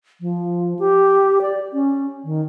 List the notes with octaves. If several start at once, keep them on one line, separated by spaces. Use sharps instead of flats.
F3
G4
D5
C#4
D#3